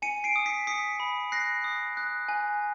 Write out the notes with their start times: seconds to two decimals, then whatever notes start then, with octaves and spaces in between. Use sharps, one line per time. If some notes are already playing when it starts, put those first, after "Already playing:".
0.02 G#5 C#7 D#7
0.24 C7 D7
0.36 D#6
0.46 B6 C#7
0.67 D#6 B6 C#7
1.00 B5
1.32 F#6 A#6 C7
1.64 D#6
1.97 F#6
2.29 G#5